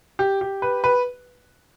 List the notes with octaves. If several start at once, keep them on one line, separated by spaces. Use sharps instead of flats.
G4
G4
B4
B4